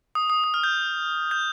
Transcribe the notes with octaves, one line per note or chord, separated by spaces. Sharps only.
D#6
D#6
D#6
F6
G6
G6